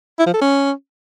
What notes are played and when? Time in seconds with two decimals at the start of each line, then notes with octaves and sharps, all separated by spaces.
0.19 E4
0.26 F3
0.34 A4
0.41 C#4